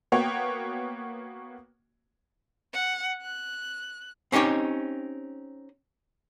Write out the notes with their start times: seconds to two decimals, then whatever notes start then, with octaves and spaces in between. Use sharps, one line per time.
0.12 A#3 B3 F#4 C#5 G5
2.73 F#5
3.22 F#6
4.32 C4 C#4 D#4 G4 C#5